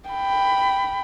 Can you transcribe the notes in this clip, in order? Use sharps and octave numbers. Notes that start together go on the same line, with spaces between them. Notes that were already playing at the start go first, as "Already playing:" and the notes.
G5 B5